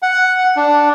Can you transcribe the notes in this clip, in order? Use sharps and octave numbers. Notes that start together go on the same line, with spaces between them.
F#5
D4